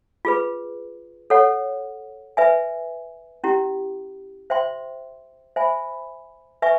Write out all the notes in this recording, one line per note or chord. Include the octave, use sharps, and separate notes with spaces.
F4 G#4 B4
A4 C#5 F#5
B4 E5 G#5
C#4 E4 G4
C5 E5 G5 C6
C5 E5 G#5 B5
B4 E5 G#5 C#6